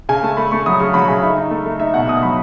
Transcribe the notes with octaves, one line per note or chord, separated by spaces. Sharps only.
C#3 G#5
A3 A5
A3 B5
A3 C#6
F#3 D#6
C#3 C#6
F#3 B5
C#3 G#5
D#4 E5
D#4
A3
A3
D#4 E5
B2 F#5
B2 D#6
F#3 B5